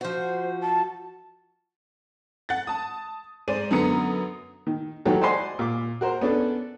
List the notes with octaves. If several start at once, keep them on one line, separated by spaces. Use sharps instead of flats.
F3 F#4 C5
A5
F#5 A6
A5 D#6
G#2 G#3 C5 D5 D#7
F#2 D3 B3 A#5 D#6 C#7
D#3
D#3 E3 F#3 F#4 G4 A4
C5 D5 D#5 F#5 G#5 C6
A#2 D6
F#4 A#4 C5
B3 C#4 D4 A4